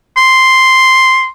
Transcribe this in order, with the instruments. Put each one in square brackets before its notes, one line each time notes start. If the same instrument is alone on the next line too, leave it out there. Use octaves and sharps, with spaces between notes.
[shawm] C6